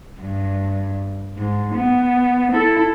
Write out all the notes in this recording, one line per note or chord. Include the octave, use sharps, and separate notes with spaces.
G2
G#2
B3
E4 A4